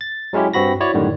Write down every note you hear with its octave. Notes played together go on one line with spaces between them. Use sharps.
A6
F#3 G#3 C#4 E4 G4
G2 C4 F#4 B5 A#6
E4 F#4 C#5 D5
F#2 A2 D3 D#3 G3